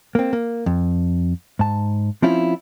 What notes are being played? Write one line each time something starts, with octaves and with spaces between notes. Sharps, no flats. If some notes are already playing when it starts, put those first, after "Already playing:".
A#3 C4
A#3
F2
G#2 A5
F3 C4 C#4 E4 F4